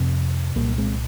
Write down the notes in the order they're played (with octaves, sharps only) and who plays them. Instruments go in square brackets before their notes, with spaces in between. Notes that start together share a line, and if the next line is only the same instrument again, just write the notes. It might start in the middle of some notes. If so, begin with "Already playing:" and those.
Already playing: [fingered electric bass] F2 C3
C2 A#2 G3 A#3
G#3 C4